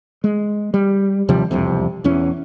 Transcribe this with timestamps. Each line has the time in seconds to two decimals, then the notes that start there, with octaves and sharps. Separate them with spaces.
0.24 G#3
0.74 G3
1.28 D#2 C3 F3 G3
1.51 E1 C2 F2 C3
2.04 E1 E2 E3 C#4